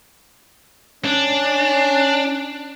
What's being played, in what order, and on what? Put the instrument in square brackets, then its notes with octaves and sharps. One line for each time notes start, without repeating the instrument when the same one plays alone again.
[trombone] C#4 [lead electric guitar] D4